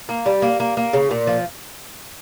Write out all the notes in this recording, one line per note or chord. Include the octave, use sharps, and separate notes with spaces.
A#3
G3
A#3
A#3
A#3
C#3
A#2
F3